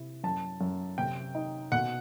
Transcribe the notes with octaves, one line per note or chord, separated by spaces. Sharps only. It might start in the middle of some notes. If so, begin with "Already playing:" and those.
Already playing: C3 E4
F#2 A5
F#2
C3 G5
D#4
B2 F#5